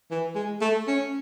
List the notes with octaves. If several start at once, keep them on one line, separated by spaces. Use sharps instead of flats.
E3
G#3
A3
C#4